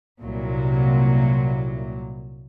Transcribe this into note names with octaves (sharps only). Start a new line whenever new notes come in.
C2 A#2 F#3